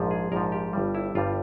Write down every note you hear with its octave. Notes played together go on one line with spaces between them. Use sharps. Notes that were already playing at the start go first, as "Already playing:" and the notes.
Already playing: A#1 G#2 F3
G#4
A#1 G#2 F3 A#4
G4
G1 G2 G3
E4
G1 G2 G3 F4